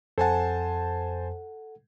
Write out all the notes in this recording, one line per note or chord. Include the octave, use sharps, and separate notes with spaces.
F2 A4 C5 F#5 G#5 A5